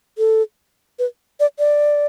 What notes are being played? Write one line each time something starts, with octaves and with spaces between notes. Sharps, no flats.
A4
B4
D5
D5